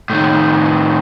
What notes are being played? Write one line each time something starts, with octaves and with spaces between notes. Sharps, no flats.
A2 D#3